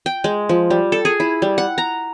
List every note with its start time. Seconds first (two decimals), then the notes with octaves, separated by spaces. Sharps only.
0.06 G5
0.24 G#3
0.49 F3
0.70 G3
0.92 A4
1.05 G#4
1.20 E4
1.42 G3
1.58 F#5
1.78 A#5